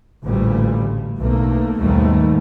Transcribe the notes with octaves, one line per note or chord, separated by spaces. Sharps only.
A1 D2 A#2 C#3 G3 A3
B1 E2 A3 A#3
D#2 G#2 B2 D#3 G3 A3